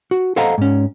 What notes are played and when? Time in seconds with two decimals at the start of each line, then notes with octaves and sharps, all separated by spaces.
0.11 F#4
0.36 A4 C5 D#5 F5 F#5 A#5
0.58 G#2 C#4